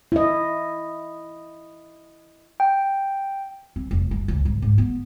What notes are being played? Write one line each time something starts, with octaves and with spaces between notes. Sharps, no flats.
E4 D#5
G5
C4
F1
F#2
C#2
G#1
G#2
B3